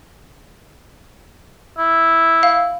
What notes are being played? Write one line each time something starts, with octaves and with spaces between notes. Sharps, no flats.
E4
F5